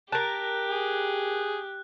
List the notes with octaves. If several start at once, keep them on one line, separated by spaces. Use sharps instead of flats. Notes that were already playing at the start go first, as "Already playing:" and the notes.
G4 A#4 A5 F#6 G6
G#4